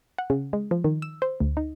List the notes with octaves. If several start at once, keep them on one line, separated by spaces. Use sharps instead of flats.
F#5
C#3
G#3
F3
D#3
E6
C5
D2
D#4